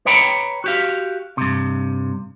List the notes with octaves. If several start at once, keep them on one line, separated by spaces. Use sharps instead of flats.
B4 C#5 G5 A#5 B5
F#4 G4 F5
G2 C3